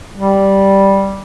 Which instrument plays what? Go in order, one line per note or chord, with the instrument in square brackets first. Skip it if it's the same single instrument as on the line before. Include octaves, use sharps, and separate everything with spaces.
[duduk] G3